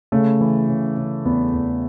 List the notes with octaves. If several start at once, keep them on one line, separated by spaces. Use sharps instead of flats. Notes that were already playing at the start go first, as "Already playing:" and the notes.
C#3 A3
E3
C#3
C#3
E2 B3
E2